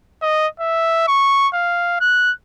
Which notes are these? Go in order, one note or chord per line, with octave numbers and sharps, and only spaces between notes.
D#5
E5
C#6
F5
F#6